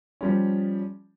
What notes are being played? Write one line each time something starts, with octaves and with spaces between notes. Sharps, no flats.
F3 G3 C#4